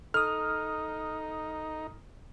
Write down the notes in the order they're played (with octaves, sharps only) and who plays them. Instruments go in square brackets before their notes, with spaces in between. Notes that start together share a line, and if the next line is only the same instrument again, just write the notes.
[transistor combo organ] D#4 [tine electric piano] A4 D#6 [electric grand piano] F6